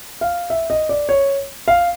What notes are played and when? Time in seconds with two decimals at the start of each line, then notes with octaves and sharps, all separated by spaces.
0.21 F5
0.50 E5
0.70 D#5
0.89 D5
1.09 C#5
1.68 F5